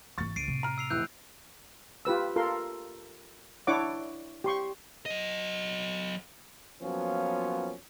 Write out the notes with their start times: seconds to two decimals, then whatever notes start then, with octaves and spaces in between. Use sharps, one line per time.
0.18 G#1 E3 C#6 A6
0.36 C#2 C7 D7 D#7
0.48 A2 C3
0.63 A#5 F6
0.78 E6 C7 F7
0.90 F1 E2 E3 E6 F#6 G6
2.05 F4 G4 B4 E6
2.36 F4 A4 A#4 C6
3.67 D4 E4 C#5 F#5 D6
4.44 G4 C6 C#6
5.06 F#3 D#5
6.82 F3 F#3 A#3 B3 C#4 F4